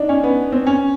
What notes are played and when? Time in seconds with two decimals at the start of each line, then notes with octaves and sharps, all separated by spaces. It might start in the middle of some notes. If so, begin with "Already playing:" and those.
Already playing: D4 D#4
0.09 C#4
0.24 B3
0.52 C4
0.66 C#4